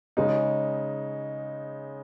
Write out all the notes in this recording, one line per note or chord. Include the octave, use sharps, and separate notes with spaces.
C#3 G#3 D#4